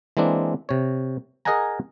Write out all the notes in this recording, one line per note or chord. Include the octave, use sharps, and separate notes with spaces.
E3 G#3 A#3 C4 D4
C3 C#5
G#4 A#4 D#5 F#5 G#5 A#5